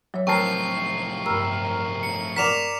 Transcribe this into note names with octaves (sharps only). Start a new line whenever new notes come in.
F#3 C#5 E5
F2 A2 C4 A#4 A5 C#6 C7
G2 A#4 E6
C#7
A#4 D5 F#5 B6 E7 F7